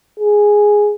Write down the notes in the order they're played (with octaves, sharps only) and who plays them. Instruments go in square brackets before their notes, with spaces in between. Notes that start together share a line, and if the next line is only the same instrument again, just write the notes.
[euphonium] G#4